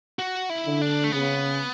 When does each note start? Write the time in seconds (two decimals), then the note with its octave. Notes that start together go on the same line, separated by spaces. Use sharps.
0.19 F#4
0.50 E4
0.65 D3
0.82 D4
1.04 A3
1.12 C#3 B3